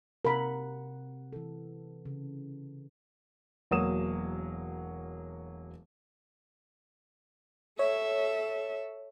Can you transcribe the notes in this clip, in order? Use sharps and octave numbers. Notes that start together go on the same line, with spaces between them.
C3 A#4 F#5 B5
E3 A4
C#3
E1 F#3 A#3 D#6 E7
A4 C#5 E5